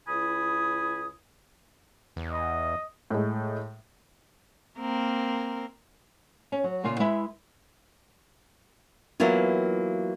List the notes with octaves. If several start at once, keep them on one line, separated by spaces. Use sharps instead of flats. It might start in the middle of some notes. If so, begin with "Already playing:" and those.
C#2 E4 G#5 B5 D#6
E2
D#5
A2 G#3
A#3 C4 A#4
C#4
F#3
A#2 C#3 A#3 F4
G#3 E4 B4 E5
E3 F#3 A#3 B3 E4 F4